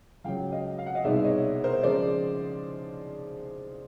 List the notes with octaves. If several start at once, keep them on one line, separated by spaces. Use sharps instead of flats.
C#2 C#3 F#3 F5 G5
D#5 F5
F5
F#5
D#5 F5
C2 B2 G#3 B3 D#4 D5 E5
C#5 D#5
A#4 C5
C#3 F3 G#3 C5 D5